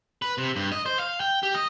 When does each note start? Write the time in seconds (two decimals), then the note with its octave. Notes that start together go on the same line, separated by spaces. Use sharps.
0.22 B4
0.38 C3
0.56 G2
0.72 D#5
0.86 C5
0.99 F5
1.20 G5
1.43 G4
1.55 D#5